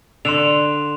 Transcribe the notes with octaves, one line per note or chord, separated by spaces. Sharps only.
D3 C6 E7 F7